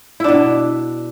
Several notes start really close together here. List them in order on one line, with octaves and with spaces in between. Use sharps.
E4 D4 B2